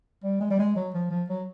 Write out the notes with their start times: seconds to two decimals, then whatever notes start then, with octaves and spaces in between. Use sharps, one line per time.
0.24 G3
0.41 G#3
0.51 G3
0.59 G#3
0.76 F#3
0.94 F3
1.11 F3
1.29 F#3